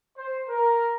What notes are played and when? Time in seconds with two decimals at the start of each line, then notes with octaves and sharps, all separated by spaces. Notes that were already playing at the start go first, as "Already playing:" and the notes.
0.17 C5
0.48 A#4